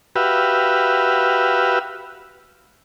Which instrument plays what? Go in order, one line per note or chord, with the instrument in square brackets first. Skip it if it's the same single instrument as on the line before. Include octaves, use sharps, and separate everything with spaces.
[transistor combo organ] F#4 G4 B4 E5 F5